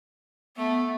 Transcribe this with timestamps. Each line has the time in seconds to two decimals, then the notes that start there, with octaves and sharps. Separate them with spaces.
0.57 A3 B3